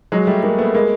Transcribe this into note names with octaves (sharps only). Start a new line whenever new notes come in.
F#3 G#3
G3 A3
G#3 A#3
A3 B3
G#3 A#3